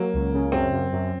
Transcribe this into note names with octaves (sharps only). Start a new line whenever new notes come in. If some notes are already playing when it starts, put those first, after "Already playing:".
Already playing: F#3 A#3
C#2
C#3
F#2 C4
F#2
F#2